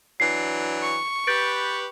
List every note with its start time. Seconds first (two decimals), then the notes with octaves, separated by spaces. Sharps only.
0.20 E3 F#3 D4 C7
0.82 C#6
1.27 G4 B4 G6 A6 D7